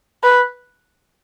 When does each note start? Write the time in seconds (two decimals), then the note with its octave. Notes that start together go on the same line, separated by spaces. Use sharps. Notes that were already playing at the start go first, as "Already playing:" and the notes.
0.23 B4